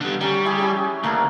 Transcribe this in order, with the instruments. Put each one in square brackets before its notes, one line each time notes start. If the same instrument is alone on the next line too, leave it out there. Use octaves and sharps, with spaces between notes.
[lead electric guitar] D3 G3
[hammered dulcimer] F#3 C#4 [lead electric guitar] G3
[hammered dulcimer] E4 G4 G#4
C#4 F#4 G#4
[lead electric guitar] D2 [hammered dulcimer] A#3 A4 A#4